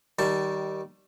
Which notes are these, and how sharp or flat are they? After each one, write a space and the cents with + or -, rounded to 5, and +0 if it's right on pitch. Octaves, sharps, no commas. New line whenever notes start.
D#3 +0 G3 -25 A5 +5